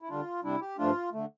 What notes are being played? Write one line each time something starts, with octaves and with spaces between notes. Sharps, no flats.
E4
D3 G3 D4 F4
C3 G3 D4 E4
G4
G2 F3 A3 D4 F4
D3 A3